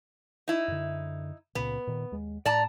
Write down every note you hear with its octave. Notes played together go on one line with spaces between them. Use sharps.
D#4 E4
F#2 D3
C#2 A#2 C#3 B3
A#2 D#3
D#2 G#3
A2 D5 A5 A#5